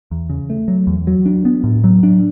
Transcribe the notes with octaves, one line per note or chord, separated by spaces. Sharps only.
E2
C#3
A3
F#3
E2
F#3
D4
B3
A2
F#3
D4